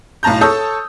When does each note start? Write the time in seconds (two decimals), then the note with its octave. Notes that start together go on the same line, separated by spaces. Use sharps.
0.23 B1 A2 A5 A#5 G6
0.41 A4 C#5 A5 D#6 E6 G6